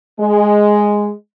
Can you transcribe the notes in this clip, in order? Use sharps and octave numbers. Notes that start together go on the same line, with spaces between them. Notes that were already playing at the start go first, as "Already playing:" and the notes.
G#3